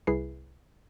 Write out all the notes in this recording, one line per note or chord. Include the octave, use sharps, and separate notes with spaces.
C2 E4 G#4 B4 C7